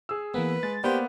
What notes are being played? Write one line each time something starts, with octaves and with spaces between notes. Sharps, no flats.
G#4 E6
E3 A#3 B3 B4
G#3 A6
A#3 B3 G4 C5 D5